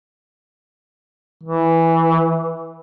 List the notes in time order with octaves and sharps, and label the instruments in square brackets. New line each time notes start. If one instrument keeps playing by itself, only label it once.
[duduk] E3